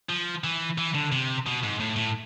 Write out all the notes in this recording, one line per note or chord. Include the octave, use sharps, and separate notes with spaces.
F3
E3
E3
D3
C3
B2
G#2
A2
A2